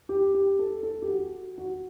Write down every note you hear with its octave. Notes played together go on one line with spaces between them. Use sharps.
G4
G4
A4
A4
G4
F#4
F#4